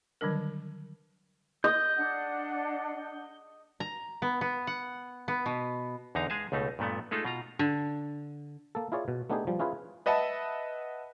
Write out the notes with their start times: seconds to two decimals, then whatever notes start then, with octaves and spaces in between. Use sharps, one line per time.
0.21 D3 D#3 F#3 G3 D4 A#4
1.64 D#5 G6
1.97 D4 F#5
3.80 A#5
4.22 B3
4.41 B3
4.67 F#5
5.28 B3
5.46 B2
6.15 E2 D3 D#4 F5 A#5
6.30 G#3 G#4 F5 G#5 A5
6.52 C#2 B2 A3 D#4
6.79 G2 A#2 A3 B3
7.11 G#3 A3 D#4 F4 A4
7.25 B2 F4 A#5
7.59 D3
8.75 A#3 A4
8.92 E4 F4 G#4 C#5 D5
9.08 B2
9.30 A3 B3 D4 D#4 G4 G#4
9.47 F3 G3
9.59 C#4 E4 F4 G#4 B4
10.06 B4 D#5 E5 F#5 A5